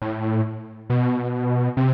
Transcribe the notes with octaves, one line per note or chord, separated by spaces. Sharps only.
A2
B2
C3